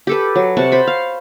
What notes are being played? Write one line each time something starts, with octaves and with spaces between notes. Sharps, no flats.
G4 A4 B4
F#3
C3 F#5 A5 C#6
C5 B5 C#6
F5